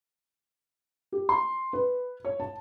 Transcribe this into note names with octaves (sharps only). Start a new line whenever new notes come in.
G4
C6
B4
C#5
A5